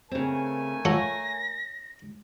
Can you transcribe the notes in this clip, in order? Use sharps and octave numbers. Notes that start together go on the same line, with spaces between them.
C#3 A3 C4 A#4 G#5
F4 A4 C#5 F#5 A#6